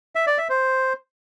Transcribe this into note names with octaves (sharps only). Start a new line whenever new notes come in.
E5
D5
E5
C5